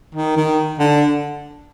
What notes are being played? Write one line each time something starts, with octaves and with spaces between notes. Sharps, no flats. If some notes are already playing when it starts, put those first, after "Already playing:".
D#3
D#3
D3